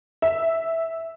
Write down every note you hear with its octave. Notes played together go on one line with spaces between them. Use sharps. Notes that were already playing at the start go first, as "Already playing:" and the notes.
E5